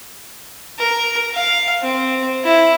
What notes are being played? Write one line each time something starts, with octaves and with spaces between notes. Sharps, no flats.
A#4
F5
C4
E4